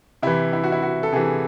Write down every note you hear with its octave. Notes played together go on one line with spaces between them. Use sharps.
C3 E3 E4
E4
F#4
E4
F#4
A4
C3 E3 G#4